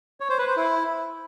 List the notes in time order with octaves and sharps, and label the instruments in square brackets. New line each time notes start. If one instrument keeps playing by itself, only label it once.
[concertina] C#5
C5
B4
C5
E4